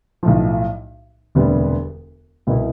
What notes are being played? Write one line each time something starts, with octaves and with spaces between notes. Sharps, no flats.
B1 A2 F3
E1 D2 C3 G3 B3
C2 B2 B3 E4